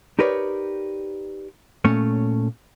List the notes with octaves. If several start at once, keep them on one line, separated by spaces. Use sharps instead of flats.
D#4 G4 A#4 B4 C#5 D5
A#2 A3 C#4 C#5